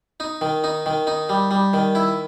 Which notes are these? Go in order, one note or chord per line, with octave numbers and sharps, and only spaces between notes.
D#4
D#3
D#4
D#3
D#4
G3
G3
D#3
E4